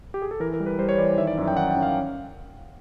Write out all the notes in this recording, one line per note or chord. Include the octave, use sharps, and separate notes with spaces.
G4
G#4
A4
E3 A#4
A#4
G3
B4
G3 C5
C#5
E3 D5
D#3 E5
D5
F#2 E5
G5
D#3 F#5
G5
C#4
F5